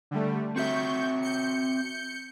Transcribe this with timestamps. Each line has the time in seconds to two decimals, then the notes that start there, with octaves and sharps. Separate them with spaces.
0.11 D3 G3 A3
0.56 C4 F#4 E5 C#6 G6
1.22 G6 C#7